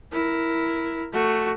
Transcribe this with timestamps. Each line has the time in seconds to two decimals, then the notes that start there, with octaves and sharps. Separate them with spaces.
0.13 E4 A#4
1.13 A3 F#4